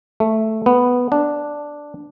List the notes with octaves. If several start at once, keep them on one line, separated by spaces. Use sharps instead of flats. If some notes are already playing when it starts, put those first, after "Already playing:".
A3
B3
D4